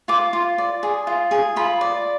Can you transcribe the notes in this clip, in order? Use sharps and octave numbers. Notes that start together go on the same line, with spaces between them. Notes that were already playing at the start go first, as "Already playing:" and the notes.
F4 D6
F4
D5
G#4
F4
G#4
F4 B5
D5